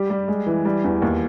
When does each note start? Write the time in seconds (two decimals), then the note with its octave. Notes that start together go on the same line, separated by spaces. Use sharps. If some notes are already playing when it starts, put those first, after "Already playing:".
Already playing: G3 G4
0.10 G3
0.28 G#3
0.47 E3
0.65 G3
0.84 E2
1.02 D#2